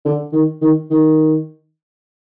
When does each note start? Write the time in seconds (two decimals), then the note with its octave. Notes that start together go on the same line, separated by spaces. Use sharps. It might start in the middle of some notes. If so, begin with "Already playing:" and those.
0.05 D3
0.33 D#3
0.61 D#3
0.90 D#3